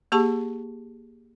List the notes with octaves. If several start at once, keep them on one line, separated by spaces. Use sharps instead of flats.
A#3 G4 G#4 A5 C#6